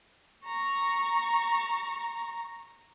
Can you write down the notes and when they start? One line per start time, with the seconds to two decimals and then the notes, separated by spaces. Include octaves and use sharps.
0.45 A#5 C#6